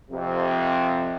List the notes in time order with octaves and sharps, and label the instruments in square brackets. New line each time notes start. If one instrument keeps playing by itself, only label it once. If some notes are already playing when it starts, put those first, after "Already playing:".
[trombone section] F2 C3